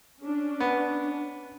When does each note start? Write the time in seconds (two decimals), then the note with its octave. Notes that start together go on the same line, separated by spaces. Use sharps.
0.22 C#4 D4
0.60 B3